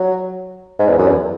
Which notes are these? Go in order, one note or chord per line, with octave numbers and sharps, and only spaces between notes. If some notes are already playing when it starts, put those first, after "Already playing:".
Already playing: F#3
G#2
E2
F#2
E2